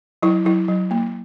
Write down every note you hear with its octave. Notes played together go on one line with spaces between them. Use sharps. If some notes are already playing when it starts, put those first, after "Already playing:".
F#3 E4
F#3 E4
F#3
A#3